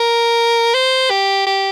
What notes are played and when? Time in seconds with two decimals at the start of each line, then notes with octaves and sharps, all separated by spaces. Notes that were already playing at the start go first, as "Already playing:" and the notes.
Already playing: A#4
0.74 C5
1.10 G4
1.47 G4